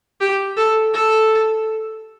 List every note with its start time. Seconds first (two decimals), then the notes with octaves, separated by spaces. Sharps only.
0.21 G4
0.57 A4
0.94 A4